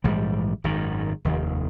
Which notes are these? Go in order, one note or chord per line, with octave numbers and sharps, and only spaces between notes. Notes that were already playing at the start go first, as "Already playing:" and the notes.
A#1 G#2 E3 G3
G#1 F#2 D#3
F1 D#2 D#3